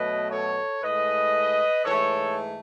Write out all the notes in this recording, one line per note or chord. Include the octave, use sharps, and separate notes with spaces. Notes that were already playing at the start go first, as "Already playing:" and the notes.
Already playing: B2 F#3 A3 B4 D#5
A4 C#5
A2 G#3 B4 D#5
G#2 E3 A3 A4 C#5